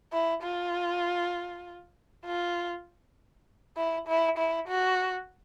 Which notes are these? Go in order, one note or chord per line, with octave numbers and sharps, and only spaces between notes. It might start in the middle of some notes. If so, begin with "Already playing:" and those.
E4
F4
F4
E4
E4
E4
F#4